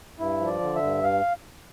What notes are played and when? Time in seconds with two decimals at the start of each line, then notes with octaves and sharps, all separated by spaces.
0.19 G2 E4
0.40 F3
0.47 D5
0.61 D3
0.75 E5
0.82 G2
1.04 F5